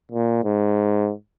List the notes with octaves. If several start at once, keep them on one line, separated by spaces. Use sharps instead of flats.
A#2
G#2